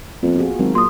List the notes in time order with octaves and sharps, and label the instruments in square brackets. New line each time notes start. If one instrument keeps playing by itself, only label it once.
[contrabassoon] F2 [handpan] A#3 B3
[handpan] F4 F#4 G#4
[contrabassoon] G#1 [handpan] F#3 A#4
[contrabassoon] A#2 [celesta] C6 D#6